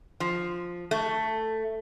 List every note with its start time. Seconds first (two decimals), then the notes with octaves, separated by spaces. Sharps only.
0.20 F3
0.91 A3